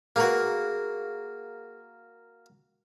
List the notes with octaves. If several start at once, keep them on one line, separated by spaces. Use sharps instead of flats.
A#3 F#4 G#4 A#4 B4